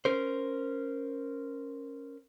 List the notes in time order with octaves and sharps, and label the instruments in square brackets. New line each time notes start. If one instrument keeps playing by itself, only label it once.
[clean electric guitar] C#4 A#4 C5